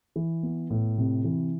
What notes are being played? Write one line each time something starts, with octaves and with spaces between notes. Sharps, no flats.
E3
B3
A2
C3
E3